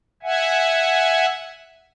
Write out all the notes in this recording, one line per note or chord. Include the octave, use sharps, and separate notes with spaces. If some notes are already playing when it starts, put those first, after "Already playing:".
E5 F#5 G#5